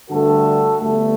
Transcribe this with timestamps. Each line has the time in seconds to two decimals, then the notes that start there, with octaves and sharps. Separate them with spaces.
0.09 G2 D3 A3 F#4 A4
0.81 G1 G2 D3 A3